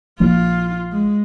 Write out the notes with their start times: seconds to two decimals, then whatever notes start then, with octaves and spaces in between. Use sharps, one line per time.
0.20 A#1 F3 A#3 F4
0.92 G#3